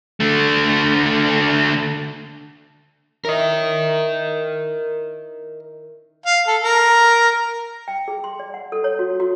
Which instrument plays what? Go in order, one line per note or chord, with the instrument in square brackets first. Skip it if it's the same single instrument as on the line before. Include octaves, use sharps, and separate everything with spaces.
[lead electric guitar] D3 A3
[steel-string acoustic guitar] D#3 C#4 E4 [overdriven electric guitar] A#4 D#5
[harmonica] F5
A4
A#4
[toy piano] G5
G#4
C6
D5
F#5
A4
C#5
F#4
F#4